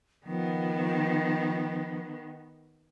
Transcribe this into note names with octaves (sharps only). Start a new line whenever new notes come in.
D#3 F3 B3